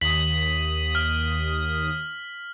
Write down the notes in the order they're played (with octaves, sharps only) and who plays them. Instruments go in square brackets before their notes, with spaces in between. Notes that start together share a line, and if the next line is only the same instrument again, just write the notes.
[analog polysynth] D#2 D#6 [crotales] B6 F#7
[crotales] F6